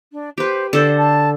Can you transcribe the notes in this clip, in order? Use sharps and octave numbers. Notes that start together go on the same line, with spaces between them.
D4
G4 B4 C5
D3 A4 C5 D5
A5